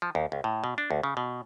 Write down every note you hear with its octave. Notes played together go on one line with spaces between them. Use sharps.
F3
D#2
C#2
A2
B2
D4
D2
C#3
B2